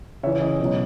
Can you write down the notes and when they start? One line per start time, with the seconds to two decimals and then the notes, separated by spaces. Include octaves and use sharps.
0.23 C#3 E3 C#5 E5
0.42 D#5
0.59 B2 C#5
0.65 F#3